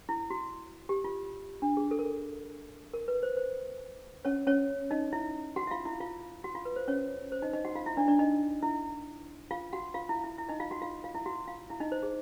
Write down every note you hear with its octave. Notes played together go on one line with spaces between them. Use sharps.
E4
F#4
G4
F4
D4
G#4
A4
A#4
A4
A#4
B4
C5
C5
C#4 C#5
C#4 C#5
D#4 D#5
E4 E5
F#4 F#5
E5
F4 F5
E4 E5
F4 F5
F#4 F#5
F4 F5
B4
C5
C#4 C#5
C5
D#4 D#5
D#4 D#5
F#4 F#5
F4 F5
E4 E5
D4 D5
D4 D5
D#4 D#5
E4 E5
F4 F5
F#4 F#5
F4 F5
E4 E5
E4 E5
E4 E5
D#4 D#5
F4 F5
F#4 F#5
F4 F5
F4 F5
E4 E5
F#4 F#5
F4 F5
E4 E5
D#4 D#5
C5
G#4